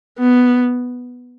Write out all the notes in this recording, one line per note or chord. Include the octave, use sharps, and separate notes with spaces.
B3